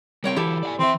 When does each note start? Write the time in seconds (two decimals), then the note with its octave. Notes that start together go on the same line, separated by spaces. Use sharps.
0.24 G3 C4 A#4 C#5 G5
0.36 E3 F#3 E4 G4 A4
0.63 D5 F#5 G#5
0.79 E3 C4 E5